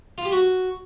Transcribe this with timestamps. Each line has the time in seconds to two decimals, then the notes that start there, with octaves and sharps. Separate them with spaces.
0.18 F4
0.25 G4
0.32 F#4